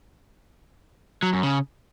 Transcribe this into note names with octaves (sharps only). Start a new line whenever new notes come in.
F#3
F#2
C#3